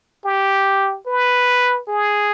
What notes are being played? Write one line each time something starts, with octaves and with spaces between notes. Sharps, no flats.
G4
B4
G#4